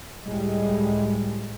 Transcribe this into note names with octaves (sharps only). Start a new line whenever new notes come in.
C#2 A2 G3 G#3